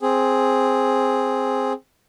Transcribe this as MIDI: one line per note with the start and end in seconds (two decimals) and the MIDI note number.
0.02 1.73 60
0.02 1.73 68